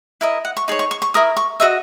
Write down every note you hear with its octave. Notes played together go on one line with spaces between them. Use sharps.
E4 A#4 D#5
F#5
C#6
D#4 G#4 C#5
C#6
C#6
C#6
E4 A#4 D#6
C#6
F#4 B4 D#5 E5